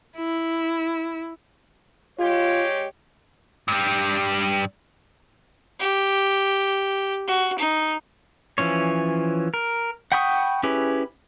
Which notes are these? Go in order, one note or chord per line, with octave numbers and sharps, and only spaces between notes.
E4
G#3 F4 G4 C#5
G2 G3
G4
F#4
D#4
E3 F3 C#4 C#5
A#4
F#5 G5 B5 C#6 D#6
C#4 E4 G4 G#4 B4